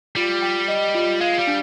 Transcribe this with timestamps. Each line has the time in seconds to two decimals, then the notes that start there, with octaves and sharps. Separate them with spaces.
0.16 G3 F4
0.42 G5
0.68 D#5
0.95 F4
1.21 G#3 F5
1.39 G3
1.47 D4